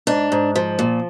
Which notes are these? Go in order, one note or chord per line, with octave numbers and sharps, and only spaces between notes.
G#2 D4
G#2
F3
A#2